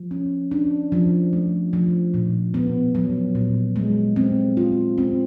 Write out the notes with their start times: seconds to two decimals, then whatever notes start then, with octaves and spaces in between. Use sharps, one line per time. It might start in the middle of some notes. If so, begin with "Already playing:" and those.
Already playing: F3
0.11 C#4
0.51 D4
0.92 F3
1.33 A3
1.73 F3
2.14 A#2
2.54 B3
2.95 F#3
3.35 A#2
3.76 G#3
4.16 C4
4.57 F4
4.98 C4